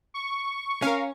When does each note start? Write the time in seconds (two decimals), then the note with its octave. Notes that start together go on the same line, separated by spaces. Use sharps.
0.14 C#6
0.82 C#4 A#4 F5